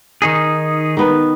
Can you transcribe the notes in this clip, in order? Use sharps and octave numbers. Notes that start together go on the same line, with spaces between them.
D#3 D#4 G#4
D#3 B3 B4